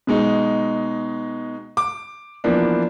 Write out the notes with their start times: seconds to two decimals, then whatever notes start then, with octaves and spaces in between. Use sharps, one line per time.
0.07 B2 G#3 D#4
1.77 D6
2.44 E3 F3 A#3 B3 D4